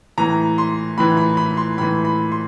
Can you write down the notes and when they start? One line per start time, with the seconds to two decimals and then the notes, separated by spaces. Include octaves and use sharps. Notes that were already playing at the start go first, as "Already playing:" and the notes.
0.18 A2 E3 A#5
0.58 C6
0.98 A2 E3 B5
1.17 B5
1.37 B5
1.57 C6
1.78 A2 E3 B5
2.05 B5
2.32 C6